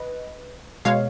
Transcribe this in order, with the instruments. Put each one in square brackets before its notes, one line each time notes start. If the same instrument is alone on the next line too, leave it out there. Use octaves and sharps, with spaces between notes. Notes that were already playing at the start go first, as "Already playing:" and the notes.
Already playing: [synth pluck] B4 D#5
B2 G#3 C#5 F5